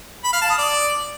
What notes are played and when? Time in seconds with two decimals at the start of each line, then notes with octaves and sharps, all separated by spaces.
0.25 B5
0.33 F5
0.41 A5
0.50 D#6
0.58 D5